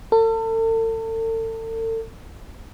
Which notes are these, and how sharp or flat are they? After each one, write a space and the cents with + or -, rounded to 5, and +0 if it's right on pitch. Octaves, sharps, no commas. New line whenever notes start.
A4 +40